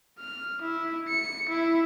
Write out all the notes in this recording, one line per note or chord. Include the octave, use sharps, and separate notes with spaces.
F6
E4
C#7
E4